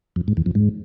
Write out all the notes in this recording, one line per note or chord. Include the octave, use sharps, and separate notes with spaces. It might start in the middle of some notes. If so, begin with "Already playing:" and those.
F2
G#2
E2
F2
G#2